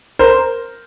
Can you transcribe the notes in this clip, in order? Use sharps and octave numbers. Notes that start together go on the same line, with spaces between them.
A#4 C5